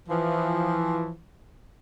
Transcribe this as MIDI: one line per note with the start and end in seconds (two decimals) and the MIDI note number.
0.09 1.13 52
0.09 1.13 53